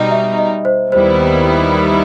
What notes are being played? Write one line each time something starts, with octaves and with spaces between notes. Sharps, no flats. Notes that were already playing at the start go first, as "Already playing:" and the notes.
Already playing: B2 G3 D#4
E5
D#5
C5
D#2 D#3 G3 B3 E4 C5